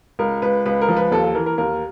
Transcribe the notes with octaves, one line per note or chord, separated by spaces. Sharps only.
C#2 A#4
C#2 B4
C#2 B4
A#4
F3
B4
D#2 A4
A4
E3 A#4
A#4
D#2 A#4